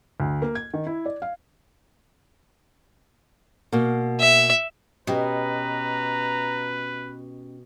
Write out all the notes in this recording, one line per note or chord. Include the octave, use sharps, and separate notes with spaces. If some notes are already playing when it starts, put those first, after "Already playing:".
D2
A#3
G#6
D#3
E4
D5
F5
B2 A#3
E5
B2 C#4 G4 B4 D#5 A#5